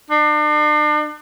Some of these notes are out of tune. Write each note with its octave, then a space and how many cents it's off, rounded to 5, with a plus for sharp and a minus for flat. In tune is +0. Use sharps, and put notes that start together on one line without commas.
D4 +40